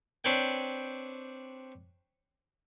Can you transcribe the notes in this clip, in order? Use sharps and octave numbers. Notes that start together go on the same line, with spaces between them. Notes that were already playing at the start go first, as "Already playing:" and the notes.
C4 D4 B4 C#5 D5 G5